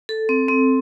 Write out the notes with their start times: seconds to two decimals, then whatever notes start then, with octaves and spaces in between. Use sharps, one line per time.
0.09 A4
0.29 C4
0.48 C4